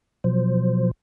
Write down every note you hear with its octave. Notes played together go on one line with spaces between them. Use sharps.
B2 F3 F#3 C5